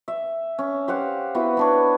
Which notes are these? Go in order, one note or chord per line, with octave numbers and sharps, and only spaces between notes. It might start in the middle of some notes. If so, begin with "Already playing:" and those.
E5
C#4
G4 C5 F5 F#5
B3 E4 F#4 B4
B3 D4 C#5